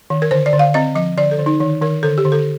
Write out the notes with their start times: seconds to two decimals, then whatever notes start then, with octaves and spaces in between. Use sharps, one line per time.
0.10 D#3
0.22 A#4
0.31 D3 C5
0.46 D5
0.53 D3
0.59 F5
0.74 C4 D#5
0.95 F3 D#5
1.17 D3 D5
1.31 A4
1.38 D3
1.46 D#4
1.60 D#3
1.82 D#3 A#4
2.03 D3 A4
2.18 G4
2.25 D3
2.32 A4